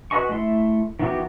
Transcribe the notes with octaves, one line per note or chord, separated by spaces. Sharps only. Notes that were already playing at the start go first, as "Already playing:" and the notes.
F#4 B4 D#5 G#5 C#6
A3 E4 C6
D#3 E3 B3 F#4 G4